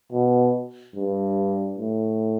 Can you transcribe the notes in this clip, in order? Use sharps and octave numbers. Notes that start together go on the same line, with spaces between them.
B2
G2
A2